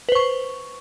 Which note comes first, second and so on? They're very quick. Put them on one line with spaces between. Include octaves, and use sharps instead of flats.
B4 C5 C#6